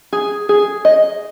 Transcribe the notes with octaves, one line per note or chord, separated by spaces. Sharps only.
G#4
G#4
D#5